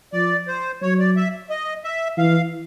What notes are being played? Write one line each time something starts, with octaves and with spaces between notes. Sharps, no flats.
F3 D5
C5
F#3 C#5
D5
E5
D#5
E5
E3 F5